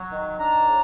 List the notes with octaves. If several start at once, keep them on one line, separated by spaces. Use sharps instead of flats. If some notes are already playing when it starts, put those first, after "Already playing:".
Already playing: F#3
D#3
D4 A#5
A2